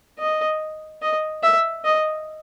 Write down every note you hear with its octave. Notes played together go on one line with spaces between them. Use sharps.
D#5
D#5
E5
D#5